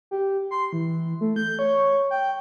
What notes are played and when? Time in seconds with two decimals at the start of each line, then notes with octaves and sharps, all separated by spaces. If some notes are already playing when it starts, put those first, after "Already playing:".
0.11 G4
0.51 C6
0.73 E3
1.21 A3
1.36 G6
1.59 C#5
2.11 G5